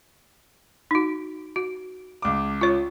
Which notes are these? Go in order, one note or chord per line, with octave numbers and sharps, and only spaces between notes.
D#4 F#4
F#4
C#2 D6
F4 C#5